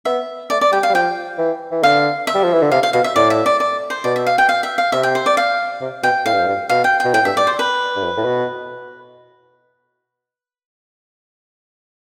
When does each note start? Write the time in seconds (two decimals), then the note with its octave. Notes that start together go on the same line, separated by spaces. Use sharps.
0.05 B3 E5
0.50 A3 D5
0.61 D5
0.72 G3 G5
0.83 F5
0.90 G3
0.94 F3 G5
1.38 E3
1.72 E3
1.83 D3 F5
2.27 E5
2.35 G3
2.44 F3
2.53 E3
2.62 D3
2.71 C3 F5
2.83 F5
2.93 B2 F5
3.04 E5
3.15 A2 D5
3.30 E5
3.46 D5
3.60 D5
3.90 C5
4.04 B2 D5
4.16 E5
4.27 F5
4.38 G5
4.49 F5
4.63 E5
4.78 F5
4.92 C3 E5
5.03 G5
5.15 C5
5.26 D5
5.37 F5
5.81 C3
6.03 B2 G5
6.26 A2 F5
6.33 G2
6.40 F2
6.46 G2
6.69 B2 F5
6.84 G5
7.00 G5
7.05 B2
7.14 A2 G5
7.25 G2 E5
7.37 G2 D5
7.47 C5
7.59 B4
7.96 G2
8.03 F2
8.17 A2
8.25 B2